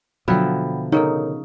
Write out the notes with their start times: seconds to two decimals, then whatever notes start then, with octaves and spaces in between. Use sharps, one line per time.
0.28 B2 D3 F3 F#3 E5 G5 B5
0.92 C#3 D#4 A4 A#4 C#5